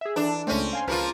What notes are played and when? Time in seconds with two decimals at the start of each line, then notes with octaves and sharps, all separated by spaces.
0.01 G#4 E5
0.16 E3 D4 A4
0.47 C#2 A3 C4 C#4
0.73 F5 G#5 C6
0.88 C#2 F3 A#3 F4 B4 F5